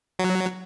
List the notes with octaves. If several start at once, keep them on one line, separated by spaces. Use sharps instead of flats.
F#3